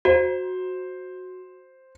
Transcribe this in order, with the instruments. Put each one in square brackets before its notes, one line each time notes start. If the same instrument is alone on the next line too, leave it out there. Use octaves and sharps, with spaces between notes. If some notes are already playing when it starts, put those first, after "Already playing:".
[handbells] F#4 [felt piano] C5